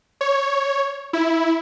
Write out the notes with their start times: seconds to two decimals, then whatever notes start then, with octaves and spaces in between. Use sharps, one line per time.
0.21 C#5
1.13 E4